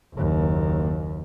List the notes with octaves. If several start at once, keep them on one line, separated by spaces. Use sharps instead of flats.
F#1 D#2